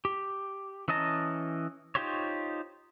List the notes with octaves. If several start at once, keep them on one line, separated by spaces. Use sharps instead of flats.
G4
E3 C#4 D#5 A5 A#5
D#4 F4 G4 C5 C#5